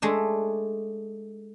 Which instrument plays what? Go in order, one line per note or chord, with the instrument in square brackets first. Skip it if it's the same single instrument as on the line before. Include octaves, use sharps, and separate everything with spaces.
[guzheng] G#3 A3 D4